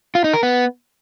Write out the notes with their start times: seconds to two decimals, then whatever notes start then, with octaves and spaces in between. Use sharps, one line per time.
0.15 F4
0.24 D#4
0.34 A#4
0.43 B3